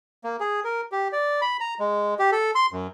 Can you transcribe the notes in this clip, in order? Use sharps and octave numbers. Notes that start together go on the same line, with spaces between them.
A#3
G#4
A#4
G4
D5
B5
A#5
G#3
G4
A4
C6
F#2